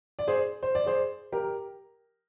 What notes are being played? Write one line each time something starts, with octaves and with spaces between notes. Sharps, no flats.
D5
G#4 C5
C5
D5
G#4 C5
G4 A#4